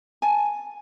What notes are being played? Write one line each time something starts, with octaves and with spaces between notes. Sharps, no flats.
G#5 A5